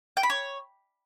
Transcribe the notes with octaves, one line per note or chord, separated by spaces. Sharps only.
G5
B5
C#5